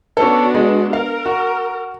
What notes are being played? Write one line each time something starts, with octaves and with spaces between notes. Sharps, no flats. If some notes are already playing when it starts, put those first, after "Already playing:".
B3 C#4 D4 F#4 A4
G#3
A#4 F5
F#4